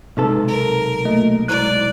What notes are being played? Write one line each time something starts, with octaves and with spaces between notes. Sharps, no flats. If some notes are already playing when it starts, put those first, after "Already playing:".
B1 C3 G#3 D#4 A4 B4
A#4
A3 A#3 F#4 D#5
G#3 E4 D5 A#5 F#6